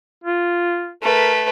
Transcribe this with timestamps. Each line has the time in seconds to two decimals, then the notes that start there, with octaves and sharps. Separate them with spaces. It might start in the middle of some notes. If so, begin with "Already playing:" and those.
0.24 F4
1.03 A3 A#4 B4